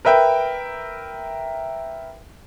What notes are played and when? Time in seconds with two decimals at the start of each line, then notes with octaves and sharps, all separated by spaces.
0.05 A#4 B4 E5 G5